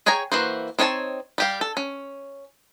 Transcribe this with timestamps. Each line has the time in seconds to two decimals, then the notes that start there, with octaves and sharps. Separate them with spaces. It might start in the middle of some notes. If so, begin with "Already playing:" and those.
0.06 G#4 C#5 G5 G#5 A#5
0.32 E3 A#3 F#4 C5
0.79 C4 D#4 C#5 E5 A5
1.38 G3 G4 F5
1.61 A4
1.77 C#4